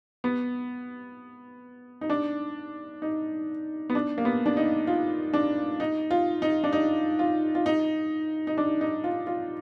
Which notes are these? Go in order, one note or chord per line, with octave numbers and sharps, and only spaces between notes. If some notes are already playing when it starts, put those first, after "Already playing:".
B3
D#4
D4
D#4
B3
D4
A#3
B3
D4
D#4
F4
D4
D#4
F4
D#4
D4
D#4
F4
F4
D#4
D#4
D4
D#4
F4
F4